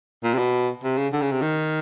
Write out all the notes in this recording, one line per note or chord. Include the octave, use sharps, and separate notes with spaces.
A#2
C3
B2
C3
C#3
D3
C#3
C3
D#3